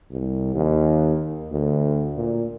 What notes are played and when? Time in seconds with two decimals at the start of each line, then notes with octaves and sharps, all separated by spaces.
0.11 C2
0.55 D#2
1.51 D2
2.17 A#2